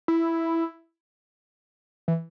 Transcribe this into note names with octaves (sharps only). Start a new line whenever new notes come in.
E4
E3